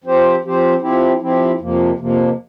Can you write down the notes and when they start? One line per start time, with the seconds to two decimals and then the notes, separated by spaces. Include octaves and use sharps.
0.04 F3 C4 G4 C5
0.43 F3 C4 G4 C5
0.81 F3 C4 E4 G4
1.21 F3 C4 E4 G4
1.60 F2 C3 F3 A#3
1.98 F2 C3 F3 A#3